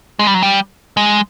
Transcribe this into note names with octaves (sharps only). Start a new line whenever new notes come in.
G#3
G3
F#3
G3
G#3